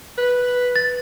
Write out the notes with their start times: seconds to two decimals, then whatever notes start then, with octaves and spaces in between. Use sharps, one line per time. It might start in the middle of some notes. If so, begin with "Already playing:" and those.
0.18 B4
0.76 A6